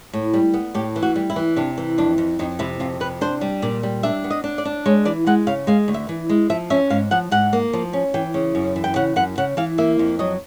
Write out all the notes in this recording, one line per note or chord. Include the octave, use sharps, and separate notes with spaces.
A2
G3
B3
A2 G4
E3
F#4
G3
E4
E3
C3 D4
E3
F2 D4
F2
F2 D#4
C3 E4
F2 F4
C3 B4
D4 C5
G3
A#2 D5
G3
D4 E5
B3
D#5
D4
D5
D4
G#3 C#5
E3 D5
G#3 F#5
C#3 F5
G#3 F5
D2
E5
E3
G#3
F3 E5
C#4 E5
G#2 F5
F3 F#5
G#2 F#5
A#3
F3
C#4
E3 G5
C#3
F#2
E3
G5
C#3 F#5
F#2 F#5
C#3 F#5
E3 F5
A#3 E5
F2
F#3 D#5